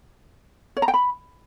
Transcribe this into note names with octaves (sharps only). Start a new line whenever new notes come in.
C#5
A#5
G5
B5